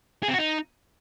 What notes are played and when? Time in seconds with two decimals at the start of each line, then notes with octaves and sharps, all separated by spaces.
0.23 G#4
0.28 C4
0.34 F#4
0.39 D#4